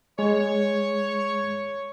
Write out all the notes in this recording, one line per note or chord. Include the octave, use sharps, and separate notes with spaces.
G#3 C#5